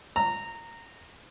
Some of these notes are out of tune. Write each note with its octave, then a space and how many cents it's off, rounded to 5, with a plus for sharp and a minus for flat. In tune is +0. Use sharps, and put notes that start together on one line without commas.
A#5 -15